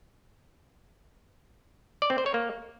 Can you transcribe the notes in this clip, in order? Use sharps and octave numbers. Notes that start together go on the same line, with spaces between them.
D5
C4
C5
C#5
A#3